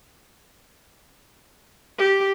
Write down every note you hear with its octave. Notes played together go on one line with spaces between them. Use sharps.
G4